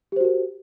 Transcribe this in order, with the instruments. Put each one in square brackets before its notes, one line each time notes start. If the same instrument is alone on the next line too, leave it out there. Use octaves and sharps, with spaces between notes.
[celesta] G4
C5
F#4
A#4